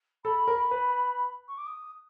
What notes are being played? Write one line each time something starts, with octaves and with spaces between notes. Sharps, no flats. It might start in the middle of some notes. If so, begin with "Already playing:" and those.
A4 B5
A#4
B4
C#6
D6
D#6